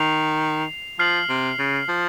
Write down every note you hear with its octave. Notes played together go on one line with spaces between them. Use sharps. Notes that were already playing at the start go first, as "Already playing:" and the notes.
Already playing: D#3 C7 F7
F3 F6 C7 F#7
C3
C#3
F3